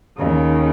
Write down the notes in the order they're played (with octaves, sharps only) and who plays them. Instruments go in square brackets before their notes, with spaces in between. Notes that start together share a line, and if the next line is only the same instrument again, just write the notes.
[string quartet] D#2 C#3